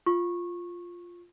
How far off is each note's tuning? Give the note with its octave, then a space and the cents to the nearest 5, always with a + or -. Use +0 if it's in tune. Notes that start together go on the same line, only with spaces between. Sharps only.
F4 +0 C#6 -20